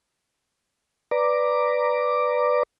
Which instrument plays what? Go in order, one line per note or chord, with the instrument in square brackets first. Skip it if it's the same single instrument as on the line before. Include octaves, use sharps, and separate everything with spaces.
[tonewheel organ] B4 D5 A#5 D6